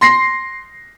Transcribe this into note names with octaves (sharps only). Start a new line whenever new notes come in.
C6 A#6 C7